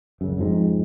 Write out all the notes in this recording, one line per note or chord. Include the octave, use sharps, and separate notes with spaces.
F#2 C#3
F2 G#2